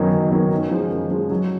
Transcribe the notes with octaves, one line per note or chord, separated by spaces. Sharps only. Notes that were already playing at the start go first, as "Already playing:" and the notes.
Already playing: F#2 D#3 F#3 B3 D#4
F#2
D#3 F#3 B3 D#4
F#2
F3 G#3
F#2
F3 G#3
F#3